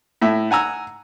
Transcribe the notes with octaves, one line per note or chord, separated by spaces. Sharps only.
A2 E5
F#5 G#5 A#5 E6